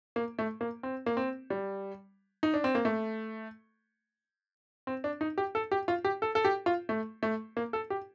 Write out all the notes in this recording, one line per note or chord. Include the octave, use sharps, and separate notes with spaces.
A#3
A3
A#3
C4
A#3
C4
G3
D#4
D4
C4
A#3
A3
C4
D4
D#4
G4
A4
G4
F4
G4
A4
A4
G4
F4
A3
A3
A#3
A4
G4